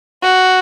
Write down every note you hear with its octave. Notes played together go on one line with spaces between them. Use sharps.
F#4